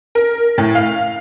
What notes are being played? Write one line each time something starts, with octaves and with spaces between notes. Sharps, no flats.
A#4
A2
F5